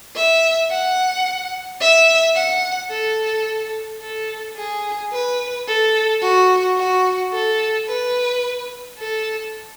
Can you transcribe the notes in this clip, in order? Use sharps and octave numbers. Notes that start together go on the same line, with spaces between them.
E5
F#5
E5
F#5
A4
A4
G#4
B4
A4
F#4
F#4
A4
B4
A4